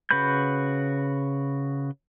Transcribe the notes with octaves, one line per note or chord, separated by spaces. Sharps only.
C#3 F#4 B4 B5 G6